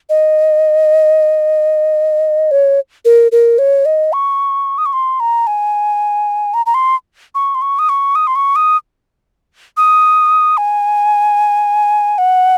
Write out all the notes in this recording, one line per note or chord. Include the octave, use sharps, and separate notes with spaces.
D#5
C#5
A#4
A#4
C#5
D#5
C#6
D#6
C#6
C6
A#5
G#5
A#5
A#5
C6
C#6
C6
C#6
D#6
C#6
D#6
C6
C#6
D#6
D#6
G#5
F#5